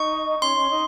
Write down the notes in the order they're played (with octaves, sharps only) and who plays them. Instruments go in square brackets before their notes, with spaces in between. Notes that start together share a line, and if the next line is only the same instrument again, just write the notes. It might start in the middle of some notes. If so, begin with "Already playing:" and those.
Already playing: [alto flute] D#4 [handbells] C#6
[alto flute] C#4 [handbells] C6
[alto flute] C#4
D#4